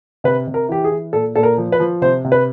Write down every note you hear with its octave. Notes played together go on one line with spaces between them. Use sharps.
C3 B4
C3
A#4
E3 G4
G#4
E3
A#2 A4
A#2 A4
A#4
F3
B4
F3
C3 C5
C3
B4